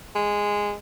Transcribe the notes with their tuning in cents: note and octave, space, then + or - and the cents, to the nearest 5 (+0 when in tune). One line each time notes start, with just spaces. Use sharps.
G#3 -10